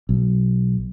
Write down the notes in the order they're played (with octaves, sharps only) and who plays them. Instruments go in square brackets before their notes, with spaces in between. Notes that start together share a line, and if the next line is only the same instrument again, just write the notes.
[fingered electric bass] B1